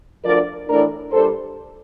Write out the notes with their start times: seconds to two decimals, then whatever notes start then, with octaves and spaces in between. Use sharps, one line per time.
0.24 D2 D3 F3 A#4 D5
0.68 A2 E3 A3 D4 A#4 D5
1.11 A#2 G3 D4 A4 C5